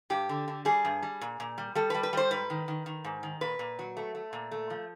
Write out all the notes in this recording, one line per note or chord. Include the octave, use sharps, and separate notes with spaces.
G2 G4
D3
D3
G3 G#4
G2
G3
A#2
A#2
G3
G3 A4
B4
G3
B4
G3 C5
G#2 B4
D#3
D#3
D#3
G#2
D#3
A#2 B4
A#2
F#3
A3
A3
A#2
A3
F3